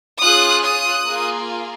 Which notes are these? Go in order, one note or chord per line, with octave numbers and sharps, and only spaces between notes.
C#4 F4 G#4 D#6 F#6
D#6 F#6
A#3 F4 G#4